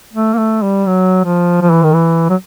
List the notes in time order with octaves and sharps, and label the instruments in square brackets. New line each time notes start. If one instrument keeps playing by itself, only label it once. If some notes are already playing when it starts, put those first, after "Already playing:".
[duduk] A3
A#3
A3
G3
F#3
F3
F3
E3
D#3
E3
F#3